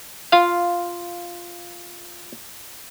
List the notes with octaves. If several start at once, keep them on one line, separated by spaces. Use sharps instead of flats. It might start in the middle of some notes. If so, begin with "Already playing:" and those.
F4 F5